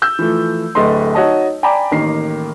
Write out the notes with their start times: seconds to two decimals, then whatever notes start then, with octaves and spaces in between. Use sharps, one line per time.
0.02 E6 G6
0.19 E3 F3 A3
0.75 D1 A3 B4 D#5 C6
1.15 D#4 F#4 C#5 D#5 A5
1.63 D5 G5 G#5 A#5 B5 D6
1.91 A1 D#3 A#3 A#4 C7